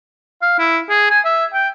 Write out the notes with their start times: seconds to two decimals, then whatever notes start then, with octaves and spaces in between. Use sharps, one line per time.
0.42 F5
0.58 E4
0.89 G#4
1.10 G#5
1.25 E5
1.53 G5